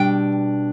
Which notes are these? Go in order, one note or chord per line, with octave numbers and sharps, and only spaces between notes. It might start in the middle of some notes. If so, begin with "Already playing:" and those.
Already playing: B2 G3 D4 G5